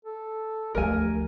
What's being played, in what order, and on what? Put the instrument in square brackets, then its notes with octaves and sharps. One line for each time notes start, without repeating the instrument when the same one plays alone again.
[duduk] A4
[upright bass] D2 F3 [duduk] G4 [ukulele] A#4 G#5